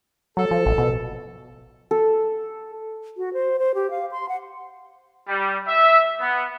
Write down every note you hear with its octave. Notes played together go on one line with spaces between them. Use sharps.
F#3 A4
F3
A1
B2
A4
F#4
C5
C5
G4
F5
C6
F#5
G3
E5
B3